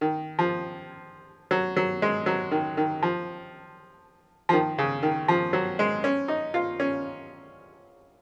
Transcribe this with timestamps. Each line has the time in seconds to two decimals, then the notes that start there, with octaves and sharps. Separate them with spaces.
0.01 D#3
0.39 F3
1.51 F#3
1.77 F#3
2.02 G#3
2.26 F#3
2.51 D#3
2.77 D#3
3.03 F3
4.49 F3
4.53 D#3
4.78 C#3
5.03 D#3
5.28 F3
5.53 F#3
5.79 G#3
6.04 C#4
6.28 D#4
6.54 F4
6.80 C#4